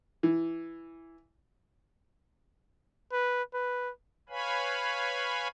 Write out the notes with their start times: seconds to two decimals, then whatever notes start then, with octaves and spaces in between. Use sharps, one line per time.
0.23 E3
3.12 B4
3.54 B4
4.29 B4 C#5 F5 G#5 B5